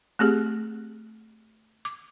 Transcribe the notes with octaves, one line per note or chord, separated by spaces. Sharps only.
A3 C4 G4 G#4
D6